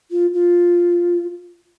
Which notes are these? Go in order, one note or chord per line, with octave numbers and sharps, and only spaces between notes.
F4
F4